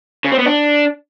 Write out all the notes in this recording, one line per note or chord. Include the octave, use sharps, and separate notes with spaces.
C#3
C4
B3
D4